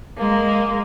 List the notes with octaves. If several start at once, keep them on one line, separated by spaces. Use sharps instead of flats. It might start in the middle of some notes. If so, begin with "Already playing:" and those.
G#3 A#3